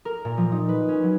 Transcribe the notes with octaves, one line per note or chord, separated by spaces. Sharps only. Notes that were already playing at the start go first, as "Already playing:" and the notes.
A#4
A#2
F3
D#4
B4
C#4
F#3